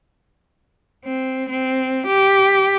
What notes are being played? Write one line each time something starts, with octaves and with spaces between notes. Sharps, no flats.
C4
C4
G4